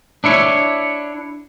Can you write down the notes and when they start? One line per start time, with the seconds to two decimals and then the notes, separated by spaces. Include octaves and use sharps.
0.24 D4 E4 C#5